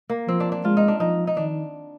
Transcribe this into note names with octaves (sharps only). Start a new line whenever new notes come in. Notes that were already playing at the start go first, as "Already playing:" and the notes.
A#3
F3 C4
D4
D4
G#3 F4
D#4
D4
F3 D#4
D#4
D#3 D4